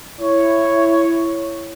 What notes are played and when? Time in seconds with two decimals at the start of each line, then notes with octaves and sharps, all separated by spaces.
0.20 E4 C#5